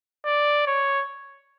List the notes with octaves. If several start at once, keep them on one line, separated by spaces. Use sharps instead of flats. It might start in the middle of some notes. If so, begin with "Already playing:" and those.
D5
C#5